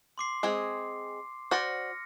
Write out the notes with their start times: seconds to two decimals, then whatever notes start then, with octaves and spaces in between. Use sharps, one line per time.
0.18 C6 D6 C7
0.43 G#3 C4 G#4
1.51 F#4 C5 D5 F6 A#6 C#7